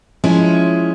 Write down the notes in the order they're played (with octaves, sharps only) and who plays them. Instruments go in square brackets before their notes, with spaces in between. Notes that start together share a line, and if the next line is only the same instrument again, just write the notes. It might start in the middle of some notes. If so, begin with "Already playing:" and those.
[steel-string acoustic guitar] F3 G#3 C#4 E4